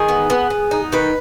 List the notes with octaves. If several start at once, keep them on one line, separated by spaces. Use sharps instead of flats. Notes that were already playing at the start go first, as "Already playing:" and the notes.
Already playing: D#3 G#4
B3
B3
B3
D#4
D#3 B4